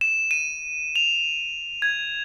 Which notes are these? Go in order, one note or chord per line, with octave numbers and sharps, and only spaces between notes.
E7
D#7
F7
G#6